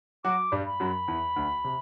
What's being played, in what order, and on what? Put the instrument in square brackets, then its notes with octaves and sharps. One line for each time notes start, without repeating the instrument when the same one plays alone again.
[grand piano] F#3 F#4 [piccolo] D6
[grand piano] G2 G3
[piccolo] B5
[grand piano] F#2 F#3
E2 E3
D2 D3
C3